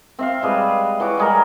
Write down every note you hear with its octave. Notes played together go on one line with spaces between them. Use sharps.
C4 E5 F5
G3 G#3 B4
E3 F#4 C#5 D6
G3 G#3 A#4